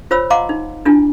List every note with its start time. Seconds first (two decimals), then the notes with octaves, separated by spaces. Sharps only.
0.11 F4 C5 C#5 B5 E6
0.30 D#5 F5 F#5 A#5 C6 D6
0.49 D#4
0.85 D4 E4 F4 G#5